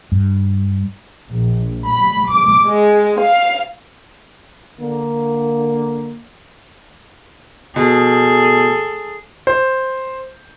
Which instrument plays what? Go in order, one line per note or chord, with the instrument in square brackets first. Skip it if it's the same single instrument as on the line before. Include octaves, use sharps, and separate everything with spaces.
[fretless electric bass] G2
[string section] A#1
B5
D6
G#3
F5
[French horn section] D3 A#3
[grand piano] B2 [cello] G#4 A4
[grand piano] C5